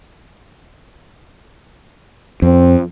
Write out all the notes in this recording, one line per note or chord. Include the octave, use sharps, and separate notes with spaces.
F2 C4